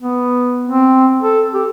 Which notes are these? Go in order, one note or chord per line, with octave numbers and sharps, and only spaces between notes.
B3
C4
A4
G4